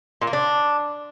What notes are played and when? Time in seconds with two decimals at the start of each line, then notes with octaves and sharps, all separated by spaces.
0.22 A#2
0.27 A#3
0.33 D4